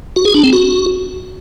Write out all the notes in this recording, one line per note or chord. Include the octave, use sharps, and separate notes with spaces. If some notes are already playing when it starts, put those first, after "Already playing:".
F#4
G#4
D4
C4
F#4